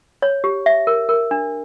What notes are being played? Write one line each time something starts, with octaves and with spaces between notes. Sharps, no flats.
C#5
G4
E5
A#4
A#4
D4